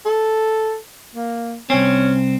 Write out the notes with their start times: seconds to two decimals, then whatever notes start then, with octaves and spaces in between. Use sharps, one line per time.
0.06 A4
1.15 A#3
1.70 C2 C4 C#4